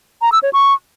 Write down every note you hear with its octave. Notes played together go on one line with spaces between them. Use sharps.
A#5
E6
C#5
C#6